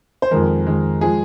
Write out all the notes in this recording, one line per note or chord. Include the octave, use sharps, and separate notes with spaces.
C5
F2 D#3 G#3 A#4
F2 D#3 G#3
F3 G#3 G#4